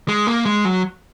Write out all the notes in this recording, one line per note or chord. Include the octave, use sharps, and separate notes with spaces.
G#3
A#3
G#3
F#3